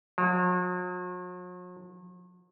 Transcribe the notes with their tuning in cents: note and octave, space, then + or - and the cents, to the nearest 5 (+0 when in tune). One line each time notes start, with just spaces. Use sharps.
F#3 -45